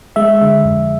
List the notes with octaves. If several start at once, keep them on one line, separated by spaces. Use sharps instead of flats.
G#3 E5
D3 E5
F2